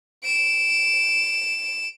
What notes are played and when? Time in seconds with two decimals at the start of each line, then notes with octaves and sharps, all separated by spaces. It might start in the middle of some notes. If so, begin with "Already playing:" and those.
0.24 D7 E7